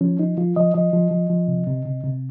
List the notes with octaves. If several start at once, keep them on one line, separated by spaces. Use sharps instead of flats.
F3 C#4
F3 D#4
F3 F4
F3 D#5
F3 D#5
F3
F3
F3
C3
C3
C3
C3